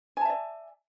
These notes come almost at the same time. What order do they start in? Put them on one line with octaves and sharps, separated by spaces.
G#5 A5 E5 D5